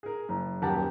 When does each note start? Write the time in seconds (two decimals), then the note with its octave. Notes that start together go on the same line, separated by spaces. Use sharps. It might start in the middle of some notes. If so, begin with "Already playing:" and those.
0.03 G#4 A#4
0.29 F#1
0.62 D#1 F#2 G4 A#4 F#5 A5